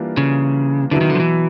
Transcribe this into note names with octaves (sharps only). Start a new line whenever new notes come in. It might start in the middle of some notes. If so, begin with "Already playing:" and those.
Already playing: E3 G3 A#3 D4 F4
C#3
B2 D3 F#3 B3 E4
D#3
D3
F3
E3